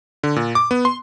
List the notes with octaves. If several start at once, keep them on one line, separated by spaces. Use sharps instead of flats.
D3
A#2
D6
B3
C6